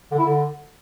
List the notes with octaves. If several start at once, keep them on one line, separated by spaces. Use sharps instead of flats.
D3
E4
D3